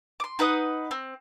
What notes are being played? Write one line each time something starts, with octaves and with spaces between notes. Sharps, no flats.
C6 D6
D#4 B4 F#5 D#6
C4